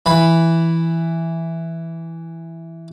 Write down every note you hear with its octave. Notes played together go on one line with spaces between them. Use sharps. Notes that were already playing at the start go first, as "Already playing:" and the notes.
E3 B5